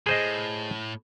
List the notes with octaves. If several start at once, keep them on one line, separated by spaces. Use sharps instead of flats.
A2 G#4 C5 D#5